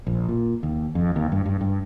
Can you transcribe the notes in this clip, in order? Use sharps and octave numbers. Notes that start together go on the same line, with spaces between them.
A#1
A#2
D#2
F2
D#2
G2
G2
G2